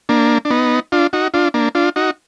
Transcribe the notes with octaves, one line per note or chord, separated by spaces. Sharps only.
A#3 D4
D4
B3 D#4
D4 F4
D#4 F#4
D4 F4
A#3 D4
D4 F4
D#4 F#4